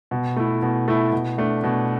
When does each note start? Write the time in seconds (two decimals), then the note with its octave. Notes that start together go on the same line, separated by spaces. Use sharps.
0.11 B2
0.36 A3 E4
0.62 B2
0.88 A3 E4
1.12 B2
1.38 A3 D4
1.63 B2